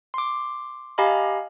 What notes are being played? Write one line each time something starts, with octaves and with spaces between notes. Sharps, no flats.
C6 D6
G4 D#5 F5 G#5 A#5 B5